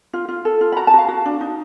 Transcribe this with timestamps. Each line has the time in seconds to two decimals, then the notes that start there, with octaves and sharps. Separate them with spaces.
0.13 F4
0.29 F4
0.45 A4
0.61 F4
0.72 B5
0.77 F#4 A#5
0.87 A5
0.94 F#4 F5
1.08 F#4
1.26 D4
1.41 D#4